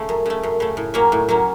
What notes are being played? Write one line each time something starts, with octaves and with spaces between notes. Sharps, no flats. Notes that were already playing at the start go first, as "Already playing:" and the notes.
Already playing: C#3 A3
F#2
C#3 A3
F#2
C#3 A3
A2
F#3 A#3 C#4
A2
F#3 A#3 C#4